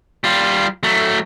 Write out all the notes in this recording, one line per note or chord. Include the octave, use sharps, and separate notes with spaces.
G3 F4
F#3 A3